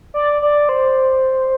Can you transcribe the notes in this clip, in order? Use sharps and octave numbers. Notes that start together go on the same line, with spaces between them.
D5
D5
C5